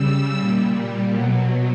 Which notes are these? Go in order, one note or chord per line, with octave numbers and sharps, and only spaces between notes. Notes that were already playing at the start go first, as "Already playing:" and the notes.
Already playing: C#3 G3 E6
A#2 G3
B2 F#3